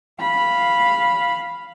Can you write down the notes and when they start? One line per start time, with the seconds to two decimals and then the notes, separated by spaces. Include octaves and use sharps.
0.20 F5 B5